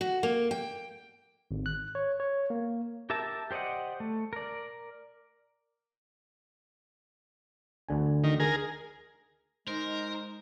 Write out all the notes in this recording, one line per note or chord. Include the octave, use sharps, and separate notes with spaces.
F#4
A#3
G5
G#1
F#6
C#5
C#5
A#3
G4 A#4 E5 A5
G4 C5 D5 D#5 F#5
A3
A#4 D5
D2 D3 G#5
D#3
G#4 A#4
G#3 D#4 A#4 C5